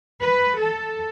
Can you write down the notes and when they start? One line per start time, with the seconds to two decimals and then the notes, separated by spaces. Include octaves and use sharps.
0.21 B4
0.60 A4